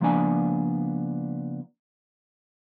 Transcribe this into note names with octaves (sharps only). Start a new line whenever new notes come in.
C#2 F3 A#3 B3 D4 G#5